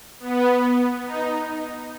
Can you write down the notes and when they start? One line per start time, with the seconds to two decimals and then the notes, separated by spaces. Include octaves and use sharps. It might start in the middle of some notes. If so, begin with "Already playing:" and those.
0.20 B3
1.06 D#4